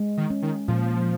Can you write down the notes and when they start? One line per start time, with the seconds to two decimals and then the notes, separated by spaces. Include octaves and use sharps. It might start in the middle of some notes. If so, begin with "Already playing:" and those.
Already playing: G#3
0.17 D#3
0.30 C#4
0.42 D#3
0.68 A#2 F3